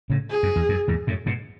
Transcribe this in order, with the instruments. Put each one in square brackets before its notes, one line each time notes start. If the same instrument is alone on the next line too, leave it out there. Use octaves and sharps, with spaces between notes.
[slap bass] A2 C#3
[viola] G#4
[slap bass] F#2
E2
F#2
E2 G#2
F#2 A2
G#2 B2